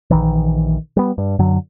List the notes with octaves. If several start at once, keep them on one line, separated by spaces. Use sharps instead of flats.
A#1 D#3 E3
G3 B3
G2
F#2 D3 F#3